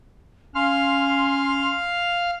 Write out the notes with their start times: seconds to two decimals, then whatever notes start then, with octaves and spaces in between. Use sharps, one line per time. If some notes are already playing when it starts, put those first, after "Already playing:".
0.55 C#4 F5 C6 F6